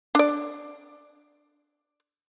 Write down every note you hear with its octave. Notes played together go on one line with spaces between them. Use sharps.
D4 D5